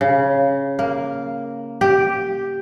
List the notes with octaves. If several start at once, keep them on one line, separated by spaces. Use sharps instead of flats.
C#3
A#3
G4